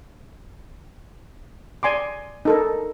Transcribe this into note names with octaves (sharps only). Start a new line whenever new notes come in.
D5 G#5 C6 D6
D#4 A4 A#4